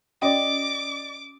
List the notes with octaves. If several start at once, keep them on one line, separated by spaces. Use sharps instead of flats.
C#4 F#4 D5 D#5 G5 D6